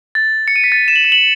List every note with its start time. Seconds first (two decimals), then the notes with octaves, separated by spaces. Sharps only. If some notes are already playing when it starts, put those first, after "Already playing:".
0.15 A6
0.48 C#7
0.56 D#7
0.64 B6
0.72 A6
0.88 E7
0.96 F#7
1.04 E7
1.12 F#7